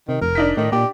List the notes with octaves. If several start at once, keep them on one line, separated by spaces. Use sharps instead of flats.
C3 D#3
F1 A#4
D4 D#4 B6
A2 D#3
A#2 G4